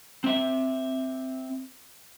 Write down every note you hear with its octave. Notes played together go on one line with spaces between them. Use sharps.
C4 E5